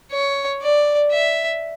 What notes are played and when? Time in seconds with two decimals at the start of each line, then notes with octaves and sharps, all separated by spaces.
0.12 C#5
0.62 D5
1.12 E5